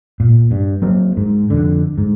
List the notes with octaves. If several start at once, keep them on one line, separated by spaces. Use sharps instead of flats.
A#2
G2
F#3 A#3 C4
G#2
F2 D3
G#2